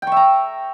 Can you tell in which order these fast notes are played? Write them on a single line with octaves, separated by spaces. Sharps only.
G5 C#6 E5 A#5